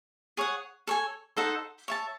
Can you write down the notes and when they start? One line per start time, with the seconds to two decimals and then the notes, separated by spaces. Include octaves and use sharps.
0.37 G#4 C#5 F#5
0.87 A4 C#5 G#5
1.37 D#4 A4 C5 F#5
1.88 C#5 E5 A5